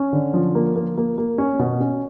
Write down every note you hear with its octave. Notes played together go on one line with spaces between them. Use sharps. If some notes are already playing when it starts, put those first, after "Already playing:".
Already playing: C#4
D3
F3
A#3
A#3
A#3
A#3
C#4
B2
C#4